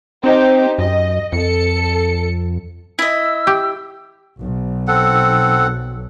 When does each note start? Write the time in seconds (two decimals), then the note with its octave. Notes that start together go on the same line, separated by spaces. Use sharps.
0.24 C4 D#4 G4 C5
0.78 F#2 D#5
1.32 F2 A4 C#7
2.99 E4 D#5 E6
3.47 G4
4.41 B1
4.88 C4 A4 F#5